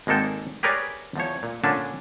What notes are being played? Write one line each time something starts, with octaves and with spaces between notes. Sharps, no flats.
G#1 G#3 A#3 A4 G5
G4 G#4 A#4 B4 C#5 D5
E2 F3 C#5
A#2
A#2 D3 C#4 D4